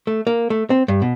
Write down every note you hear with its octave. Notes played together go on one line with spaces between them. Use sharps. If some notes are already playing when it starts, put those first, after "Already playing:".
A3
A#3
A3
C4
G2
B2